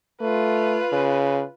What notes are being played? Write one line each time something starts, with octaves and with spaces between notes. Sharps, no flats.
A3 F4 B4
C#3